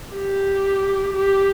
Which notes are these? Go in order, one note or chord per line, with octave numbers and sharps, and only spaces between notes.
G4
G4